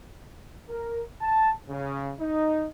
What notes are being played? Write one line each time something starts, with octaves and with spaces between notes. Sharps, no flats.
A#4
A5
C#3
D#4